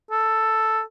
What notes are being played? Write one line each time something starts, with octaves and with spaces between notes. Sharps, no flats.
A4